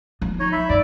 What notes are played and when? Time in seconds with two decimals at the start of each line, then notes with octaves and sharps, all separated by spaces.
0.21 F3 A#3
0.40 D#4 C#5
0.52 E5 B5
0.69 G2 D5